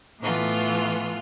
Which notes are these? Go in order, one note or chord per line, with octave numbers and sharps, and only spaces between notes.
A2 E3 A3 B3 F4